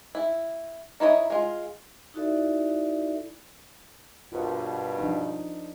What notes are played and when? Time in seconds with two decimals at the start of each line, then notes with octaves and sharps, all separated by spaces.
0.15 E4
1.00 D#4 E4 C#5 D#5
1.30 G#3 F4
2.14 D#4 E4 F#4 A4 D5 E5
4.32 G2 B2 F4 A#4 C5
4.99 F3 D4 D#4